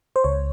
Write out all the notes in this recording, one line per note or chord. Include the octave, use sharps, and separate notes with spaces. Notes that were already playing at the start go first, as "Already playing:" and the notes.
C5
C#2 C#5